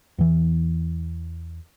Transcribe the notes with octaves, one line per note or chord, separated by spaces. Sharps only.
E2 E3